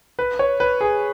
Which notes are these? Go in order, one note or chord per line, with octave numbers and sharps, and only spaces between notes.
B4
C#5
B4
G#4